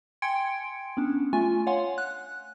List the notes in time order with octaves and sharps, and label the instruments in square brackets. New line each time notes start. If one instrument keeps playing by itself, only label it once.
[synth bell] G5 G#5 C6 G#6 C#7 D7
B3 C#4 D4
A3 F4 G#5
C#5 F5 F#5 G#5 C6
F#6